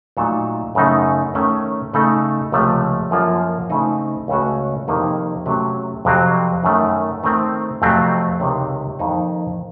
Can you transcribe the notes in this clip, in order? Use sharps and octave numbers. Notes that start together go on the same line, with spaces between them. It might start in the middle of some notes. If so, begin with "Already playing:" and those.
A#2 F#3 A3 D#4 A4
F#2 C#3 A3 D#4
D#3 A3 C#4
C#3 A3 D#4 A4
C#2 C3 F3 A3
F#2 F3 A#3 F4 A4
C#3 A3 C4 D#4
C#2 C#3 A3 C#4 F#4
F2 C3 D#3 A#3 D#4
C3 F#3 A3 C#4
F2 C3 F#3 C4
F#2 D#3 A3
D#3 A3 C4
F2 C3 F#3 A3 C4
C#2 C3 D#3
F2 D#3 A#3 D#4